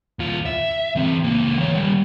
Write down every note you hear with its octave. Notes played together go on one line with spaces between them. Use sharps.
D#2 F4
E5
E3 C4
C#2 A#3
E3 C#5
D#3 G3